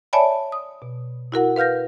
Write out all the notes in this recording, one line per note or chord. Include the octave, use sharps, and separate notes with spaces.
C#5 D5 E5 G#5 A5 B5
D#6
B2
E4 F#4 A#4 F#5
B4 F5 F6 G6 A#6